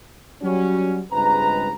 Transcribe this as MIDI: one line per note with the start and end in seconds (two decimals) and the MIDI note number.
0.42 1.01 54
0.42 1.01 55
0.42 1.01 61
0.42 1.01 66
1.12 1.71 37
1.12 1.71 43
1.12 1.71 56
1.12 1.71 60
1.12 1.71 71
1.12 1.71 82